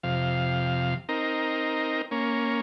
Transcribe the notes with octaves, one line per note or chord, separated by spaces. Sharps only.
F2 C3 F5
C4 D#4 A#4
A#3 C#4